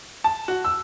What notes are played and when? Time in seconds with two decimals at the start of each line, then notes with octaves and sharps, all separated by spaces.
0.24 A5
0.48 F#4
0.64 E6